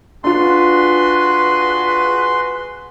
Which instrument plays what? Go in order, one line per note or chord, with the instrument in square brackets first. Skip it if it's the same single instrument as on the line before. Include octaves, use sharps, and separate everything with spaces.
[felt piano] D4 F4 [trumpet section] F#4 G#4 B4 [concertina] C6